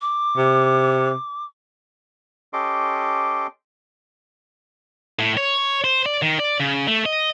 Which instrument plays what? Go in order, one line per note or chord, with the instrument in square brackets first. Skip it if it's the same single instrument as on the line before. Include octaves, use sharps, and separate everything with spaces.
[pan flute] D6
[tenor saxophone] C3
[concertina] C#4 G4 A4 D#5 C6 D6
[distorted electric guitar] A2
C#5
C5
D5
D#3
D5
C#3
A3
D#5